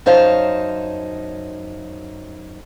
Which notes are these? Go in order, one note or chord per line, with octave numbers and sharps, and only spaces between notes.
F#2 D#4 C5 C#5 F5 A5